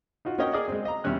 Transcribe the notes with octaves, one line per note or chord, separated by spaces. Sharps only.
D#4 F4 F#4
A#3 C#4 F#4 C#5 D#5 G5
G#4 A#4 D5 D#5
G#3 C4
D#5 A#5
E2 C3 G3 C#4 F#6